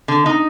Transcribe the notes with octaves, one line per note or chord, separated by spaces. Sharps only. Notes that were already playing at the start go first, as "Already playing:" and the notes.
D3
D#4